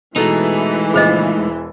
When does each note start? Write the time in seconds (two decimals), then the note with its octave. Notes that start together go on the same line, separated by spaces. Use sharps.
0.16 B2 E3 G#3 A3 D#4 A4 A#5
0.94 A#2 C#3 F3 G#4 C5 D#5
1.36 E1